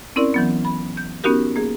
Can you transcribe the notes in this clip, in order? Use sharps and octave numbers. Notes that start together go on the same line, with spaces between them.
C4 C#4 E4 A#4 D5
E3 F#3 B3
B5
G6
B3 C#4 D#4 F#4 G4 A#4
A#3 G#4